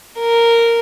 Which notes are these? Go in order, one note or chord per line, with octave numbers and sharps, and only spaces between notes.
A#4